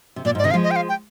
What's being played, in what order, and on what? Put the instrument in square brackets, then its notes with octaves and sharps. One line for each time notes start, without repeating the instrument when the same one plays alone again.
[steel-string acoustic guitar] C3
[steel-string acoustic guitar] A#2 [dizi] D5
[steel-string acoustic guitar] G#2
[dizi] D5
[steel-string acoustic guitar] C3 D#3 [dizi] D#5
[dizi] F5
[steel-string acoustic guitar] F3 G#3
[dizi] D#5
G5
F5
G5